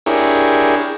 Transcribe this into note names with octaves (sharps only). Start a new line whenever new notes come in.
D4 E4 G4 G#4 A#4 C#5